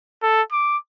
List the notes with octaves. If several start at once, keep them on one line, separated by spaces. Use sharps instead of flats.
A4
D6